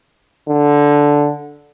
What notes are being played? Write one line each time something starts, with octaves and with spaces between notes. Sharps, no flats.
D3